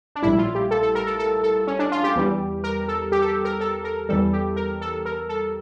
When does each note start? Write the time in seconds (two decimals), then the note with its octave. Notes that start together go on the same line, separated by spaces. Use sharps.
0.16 D4
0.23 A#1 A2 G3 E4
0.38 F4
0.55 G4
0.71 A4
0.83 A4
0.95 A#4
1.07 A4
1.19 A4
1.43 A4
1.67 C#4
1.79 D4
1.92 F4
2.04 G4
2.16 E2 E3 G3
2.64 A#4
2.88 A4
3.12 G4
3.22 A4
3.28 G4
3.45 A#4
3.61 A4
3.84 A#4
4.09 E2 E3 G3 A4
4.33 G4
4.56 A#4
4.81 A4
5.06 A#4
5.29 A4